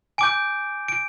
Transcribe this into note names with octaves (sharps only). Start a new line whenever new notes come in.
G#5 D6 G6 D7
D7